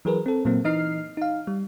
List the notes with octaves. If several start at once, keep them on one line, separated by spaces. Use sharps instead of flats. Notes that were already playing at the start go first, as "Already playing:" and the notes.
E3 F#3 G#4 A#4 B4
C4 A4
A#2 F#3 A#3 C4
E3 D#4 D#5 F6 C7
D#4 F5
G3